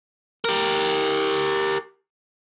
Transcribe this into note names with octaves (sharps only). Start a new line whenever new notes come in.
G4 A#4